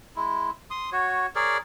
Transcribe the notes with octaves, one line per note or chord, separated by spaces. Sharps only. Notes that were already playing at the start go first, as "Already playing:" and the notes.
G#3 E4
C6 D#6
F#4 C#5
G#4 A#4 C#5 D5